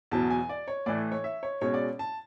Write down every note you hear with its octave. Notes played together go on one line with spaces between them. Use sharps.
E2 B2 F#3 A5
G#5
D5
C#5
A2 E3 A3 D5
C#5
E5
C#5
B2 G#3 C#4 C#5
D5
A5